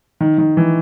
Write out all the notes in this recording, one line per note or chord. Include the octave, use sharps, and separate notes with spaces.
D#3
D#3
E3